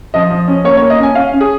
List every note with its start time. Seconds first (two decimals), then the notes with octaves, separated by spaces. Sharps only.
0.14 F3 D#5
0.31 F3
0.48 C#4
0.64 A#3 C#5
0.77 A#3 C#5
0.90 D#5
0.99 C#4 G#5
1.15 C#4 F5
1.33 C#4
1.41 G#4